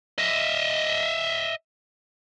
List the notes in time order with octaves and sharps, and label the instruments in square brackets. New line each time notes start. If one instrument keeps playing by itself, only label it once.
[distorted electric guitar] D#5 E5